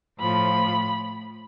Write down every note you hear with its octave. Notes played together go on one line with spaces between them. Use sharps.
A2 F3 B5